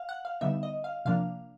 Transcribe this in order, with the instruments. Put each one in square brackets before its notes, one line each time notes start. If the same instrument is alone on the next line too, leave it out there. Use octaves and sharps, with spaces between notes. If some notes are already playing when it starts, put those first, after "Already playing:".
Already playing: [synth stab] F5
F#5
F5
D3 G3 B3 D#4 E5
D#5
F5
C3 F3 A#3 D4 F5